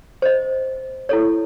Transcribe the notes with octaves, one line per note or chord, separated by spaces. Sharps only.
C5 D#5
E4 A4 C#5